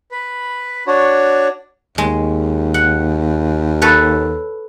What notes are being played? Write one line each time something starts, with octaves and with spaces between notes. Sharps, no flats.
B4
D4 F#4 C#5
D#2 G#3
F#5
A4 B4 C#5